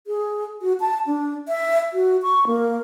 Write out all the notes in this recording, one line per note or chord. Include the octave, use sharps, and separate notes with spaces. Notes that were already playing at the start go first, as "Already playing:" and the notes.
G#4
F#4
A5
D4
E5
F#4
C#6
A#3